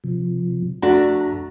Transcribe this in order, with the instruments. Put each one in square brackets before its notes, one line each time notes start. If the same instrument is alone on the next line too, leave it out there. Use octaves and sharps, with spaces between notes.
[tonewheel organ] C3 F3
[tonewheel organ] F2 A#5 [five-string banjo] A3 D4 F#4